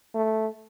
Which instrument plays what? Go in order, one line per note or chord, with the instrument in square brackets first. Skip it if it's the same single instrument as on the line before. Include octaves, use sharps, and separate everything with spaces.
[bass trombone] A3